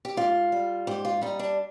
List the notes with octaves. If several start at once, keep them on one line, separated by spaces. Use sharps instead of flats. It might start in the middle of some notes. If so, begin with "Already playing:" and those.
G4
G#2 F4
G3
G#2 G4
F4
G3 D#4
D4